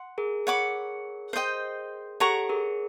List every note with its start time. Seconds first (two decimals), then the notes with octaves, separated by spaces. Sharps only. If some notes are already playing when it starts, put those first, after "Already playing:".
Already playing: F#5 C6
0.18 G#4 A#4
0.47 C#5 F#5 B5 D6
1.33 C5 D#5 G5
2.20 G4 A4 C#5 F#5 A#5 C#6
2.49 G#4 A#4